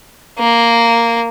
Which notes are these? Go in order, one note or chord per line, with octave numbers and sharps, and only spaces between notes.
A#3